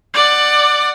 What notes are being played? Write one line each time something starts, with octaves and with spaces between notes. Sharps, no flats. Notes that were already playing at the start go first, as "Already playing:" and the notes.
D5 F#5